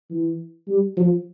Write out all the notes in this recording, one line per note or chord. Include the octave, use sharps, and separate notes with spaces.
E3
G3
F3